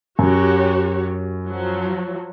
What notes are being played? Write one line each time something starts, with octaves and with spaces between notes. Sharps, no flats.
F#2 F#4 G4 C#5
F3 F#3